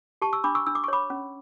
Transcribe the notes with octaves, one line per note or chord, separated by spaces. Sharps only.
G4 A5 C#6
C#6 E6
D4 B5 D6
C#6 E6
D4 E6
D6
C#6
C#5 B5 D6
C#4